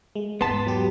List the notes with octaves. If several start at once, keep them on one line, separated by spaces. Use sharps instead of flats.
G#3
E2 G#2 B3 A5 C6 A6 B6
F#3 G4